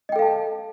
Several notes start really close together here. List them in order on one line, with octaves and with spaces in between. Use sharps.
D#5 G5 A4 F5 A5